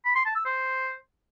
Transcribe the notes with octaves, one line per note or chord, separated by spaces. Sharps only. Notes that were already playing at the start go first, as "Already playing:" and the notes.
B5
C6
A5
E6
C5